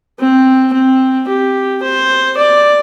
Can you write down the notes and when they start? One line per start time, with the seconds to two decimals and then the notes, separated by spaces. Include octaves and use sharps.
0.19 C4
0.73 C4
1.28 G4
1.83 C5
2.38 D5